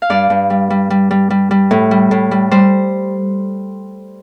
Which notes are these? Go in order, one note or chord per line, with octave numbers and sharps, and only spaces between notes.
F5
G2 D5
G2
G3
G3
G3
G3
G3
G3
A2
G3
A2
G3
G3 C5